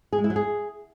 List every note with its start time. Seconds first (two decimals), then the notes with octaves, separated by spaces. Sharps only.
0.13 G#4
0.18 G#3
0.24 E4
0.30 F#3
0.36 G#4